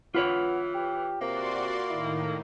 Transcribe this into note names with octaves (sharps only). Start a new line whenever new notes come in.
E3 B3 F4 B4 C#5
G4
C3 A#3 F#4 D5 C6
A2 D#3 E4